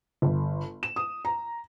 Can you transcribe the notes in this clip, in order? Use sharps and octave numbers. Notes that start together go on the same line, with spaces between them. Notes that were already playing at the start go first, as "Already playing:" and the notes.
G1
E7
D#6
A#5